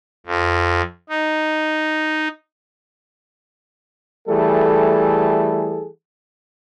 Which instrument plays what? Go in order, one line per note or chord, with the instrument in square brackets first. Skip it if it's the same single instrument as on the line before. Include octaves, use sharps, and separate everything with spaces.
[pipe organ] F2
D#4
[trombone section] E3 G3 A3 G#4 A4